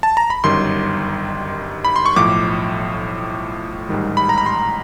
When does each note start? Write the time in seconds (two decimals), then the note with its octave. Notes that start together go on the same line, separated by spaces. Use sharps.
0.03 A5
0.17 A#5
0.30 B5
0.43 G1 F#2 D#3 G3 C6
1.85 B5
1.96 C6
2.06 C#6
2.16 B1 A2 F3 D6
3.89 A1 G#2 D#3 G3
4.17 B5
4.29 A#5
4.38 B5
4.46 C6